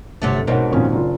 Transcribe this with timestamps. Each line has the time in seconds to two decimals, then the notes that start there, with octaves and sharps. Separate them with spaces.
0.22 G1 C3 F#3 A3
0.47 G#2 B2 C4 D#4 A#4 C#5 F#5
0.72 F2 A#2 D#3 C#4 F4
0.92 F#1 D4 F4